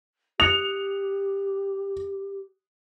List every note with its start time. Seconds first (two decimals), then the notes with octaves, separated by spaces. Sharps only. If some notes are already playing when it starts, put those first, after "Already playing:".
0.40 G4 D#6 F#6 C#7 F7